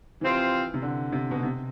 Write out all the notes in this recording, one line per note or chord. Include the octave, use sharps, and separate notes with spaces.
C3 E3 F3 C4 F4
C3
D3
C3
B2
C3